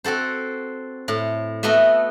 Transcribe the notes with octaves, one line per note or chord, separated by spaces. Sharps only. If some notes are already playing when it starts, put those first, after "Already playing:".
C4 F#4 A4 C5
A2
A3 B3 F#4 D#5 E5